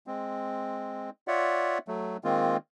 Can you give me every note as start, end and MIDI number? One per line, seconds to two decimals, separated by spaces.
0.07 1.10 56
0.07 1.10 60
1.28 1.78 65
1.28 1.78 73
1.28 1.78 74
1.28 1.78 76
1.28 1.78 78
1.88 2.17 54
1.88 2.17 57
2.24 2.57 51
2.24 2.57 56
2.24 2.57 58
2.24 2.57 60
2.24 2.57 65